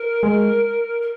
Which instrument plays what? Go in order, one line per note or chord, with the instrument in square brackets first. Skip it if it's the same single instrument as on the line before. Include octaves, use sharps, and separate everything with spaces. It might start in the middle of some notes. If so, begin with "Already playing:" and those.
Already playing: [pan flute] A#4
[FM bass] G#3
[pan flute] A#4